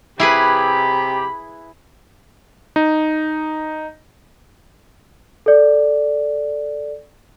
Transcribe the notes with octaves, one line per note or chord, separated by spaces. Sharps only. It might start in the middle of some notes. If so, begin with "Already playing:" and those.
C3 E4 G4 G#4 B4 B5
D#4
A4 D5